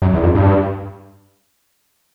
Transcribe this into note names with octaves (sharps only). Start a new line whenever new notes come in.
F#2
E2
F2
G2